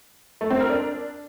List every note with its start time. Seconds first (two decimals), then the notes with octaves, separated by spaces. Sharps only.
0.41 A3
0.50 C4
0.60 A#4
0.70 D4